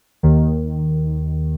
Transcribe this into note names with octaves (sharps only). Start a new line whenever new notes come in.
D#2 D#3